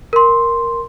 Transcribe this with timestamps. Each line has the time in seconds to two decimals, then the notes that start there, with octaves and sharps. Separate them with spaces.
0.13 A#4 C6